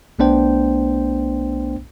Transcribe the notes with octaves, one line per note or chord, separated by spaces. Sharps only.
B1 A3 B3 D4 C5 G5